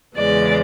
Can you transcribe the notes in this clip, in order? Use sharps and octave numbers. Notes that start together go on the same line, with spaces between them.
E2 C#3 E3 G#3 D5